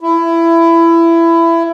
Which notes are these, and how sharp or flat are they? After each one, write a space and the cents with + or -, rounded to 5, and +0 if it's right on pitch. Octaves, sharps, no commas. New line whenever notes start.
E4 +20